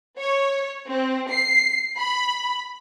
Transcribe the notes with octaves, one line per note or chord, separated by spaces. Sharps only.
C#5
C4
C7
B5